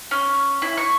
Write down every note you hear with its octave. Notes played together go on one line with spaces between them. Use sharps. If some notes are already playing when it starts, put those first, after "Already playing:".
C#4
E4
C#6